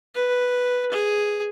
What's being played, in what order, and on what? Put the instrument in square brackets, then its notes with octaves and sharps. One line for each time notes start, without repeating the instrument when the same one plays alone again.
[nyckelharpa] B4
G#4